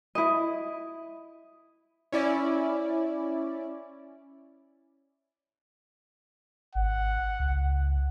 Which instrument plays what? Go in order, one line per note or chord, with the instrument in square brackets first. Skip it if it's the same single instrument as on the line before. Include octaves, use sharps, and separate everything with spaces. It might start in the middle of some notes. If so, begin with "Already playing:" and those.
[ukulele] E4 D#5
[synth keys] C#4 E4 D5
[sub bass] G#1 [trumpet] F#5
[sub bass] C#2